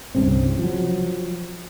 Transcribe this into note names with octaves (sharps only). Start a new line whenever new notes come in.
C2 G2 C#3 C4
F3 F#3